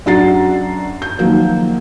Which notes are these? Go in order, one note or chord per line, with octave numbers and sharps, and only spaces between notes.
F#2 D4 F#4 A#5 A6 C7
G6
D#3 F3 F#3 A#3